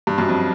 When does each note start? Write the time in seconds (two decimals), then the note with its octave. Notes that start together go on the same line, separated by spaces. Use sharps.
0.07 G2
0.18 F#2
0.28 F2